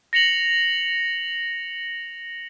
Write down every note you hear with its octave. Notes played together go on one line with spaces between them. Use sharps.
A#6 C#7 F7 F#7